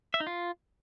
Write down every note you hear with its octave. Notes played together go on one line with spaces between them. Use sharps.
E5
D#4
F4